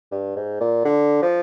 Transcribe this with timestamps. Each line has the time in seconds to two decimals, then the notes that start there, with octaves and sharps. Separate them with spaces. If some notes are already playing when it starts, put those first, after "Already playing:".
0.11 G2
0.36 G#2
0.60 A#2
0.85 D3
1.22 F3